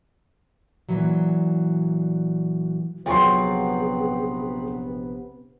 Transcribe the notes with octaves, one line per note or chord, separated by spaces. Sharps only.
A#2 E3 F#3
A#1 C3 F3 F#3 B3 G#4 G5 C6